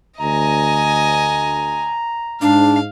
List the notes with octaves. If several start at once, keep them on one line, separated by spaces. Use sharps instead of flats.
D2 D#5 G#5 A#5
G#2 D4 F5